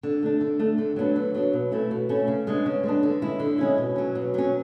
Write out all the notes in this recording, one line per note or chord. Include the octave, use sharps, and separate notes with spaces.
D3
A3 D4
D3
A3 D4
D3
F#3 B3 D4
D3
F#3 B3 D4
B2
A3 C#4 E4
B2
A3 C#4 E4
C#3
G#3 B3 D4
C#3
G#3 B3 D4
D3
G#3 C#4 E4
D3
G#3 C#4 E4
B2
F#3 C#4
B2
F#3 C#4